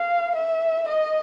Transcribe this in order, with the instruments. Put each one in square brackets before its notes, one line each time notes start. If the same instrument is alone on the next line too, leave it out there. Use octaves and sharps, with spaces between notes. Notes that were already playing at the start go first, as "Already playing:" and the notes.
Already playing: [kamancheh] F5
E5
D#5